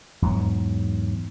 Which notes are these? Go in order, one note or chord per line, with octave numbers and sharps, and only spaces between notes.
E2 G#2 F#3